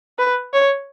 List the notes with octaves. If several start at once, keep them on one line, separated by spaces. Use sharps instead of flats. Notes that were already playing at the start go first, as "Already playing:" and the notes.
B4
C#5